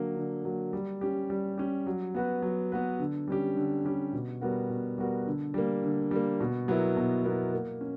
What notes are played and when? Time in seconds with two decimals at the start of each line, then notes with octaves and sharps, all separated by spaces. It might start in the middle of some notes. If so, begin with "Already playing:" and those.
Already playing: D3 F#3 A#3
0.16 D3
0.45 F#3 A#3
0.73 G3
1.01 C#4 G4
1.30 G3
1.58 C#4 G4
1.86 F#3
2.15 B3 F#4 B4
2.42 F#3
2.72 B3 F#4 B4
3.00 D3
3.28 G3 C#4 G4
3.57 D3
3.85 G3 C#4 G4
4.13 B2
4.41 G3 B3 F#4 A#4
4.69 B2
4.98 G3 B3 F#4 A#4
5.27 D3
5.54 G3 A#3
5.83 D3
6.11 G3 A#3
6.40 B2
6.68 F#3 B3 E4 A#4
6.97 B2
7.24 F#3 B3 E4 A#4
7.54 A#3
7.81 C#4